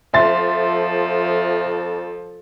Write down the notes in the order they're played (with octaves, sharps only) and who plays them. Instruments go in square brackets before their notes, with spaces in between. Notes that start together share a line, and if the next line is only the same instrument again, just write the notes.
[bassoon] F2 [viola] F3 [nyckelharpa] A4 [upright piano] E5 C6 A6